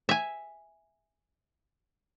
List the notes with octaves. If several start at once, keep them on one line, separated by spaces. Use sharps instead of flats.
E5 G#5